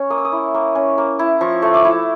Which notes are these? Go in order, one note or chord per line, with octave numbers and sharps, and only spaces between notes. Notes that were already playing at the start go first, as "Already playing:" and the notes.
Already playing: C#4
A#3 D#6
E6
D#6
E4
A#3
C#4
A#3
E4
F3 C#6
A3
D6
E4